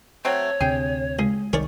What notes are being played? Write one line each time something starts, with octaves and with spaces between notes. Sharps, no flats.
F#3 A3 C4 C#5
D2 C3 G#4 G5
C#2 G#4
C2 D#3 G#4 A#4 C#5 D5